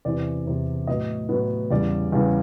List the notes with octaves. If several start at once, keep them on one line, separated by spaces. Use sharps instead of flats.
E2 C3 E3 D5
E2 C3 E3
A2 F#3 B3 D#5
A2 F#3 B3
E2 C#3 E3 G3 D5
E2 C#3 E3 G3